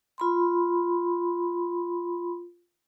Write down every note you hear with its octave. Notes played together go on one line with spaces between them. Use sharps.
F4 B5 C6